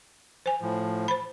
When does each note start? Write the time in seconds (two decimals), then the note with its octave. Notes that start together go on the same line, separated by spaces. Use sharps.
0.46 C5 G#5
0.62 A2 F3
1.08 C5 B5